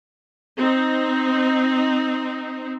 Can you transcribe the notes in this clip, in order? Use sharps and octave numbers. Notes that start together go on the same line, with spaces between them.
C4 D#4